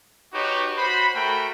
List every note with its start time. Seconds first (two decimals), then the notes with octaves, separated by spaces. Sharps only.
0.33 D#4 F#4 G4 B4 C#5
0.78 F#4 C5 B5
1.15 A3 F#4 A#4 G5 B5